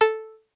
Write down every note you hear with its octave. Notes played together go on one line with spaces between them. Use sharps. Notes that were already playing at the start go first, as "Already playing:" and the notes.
A4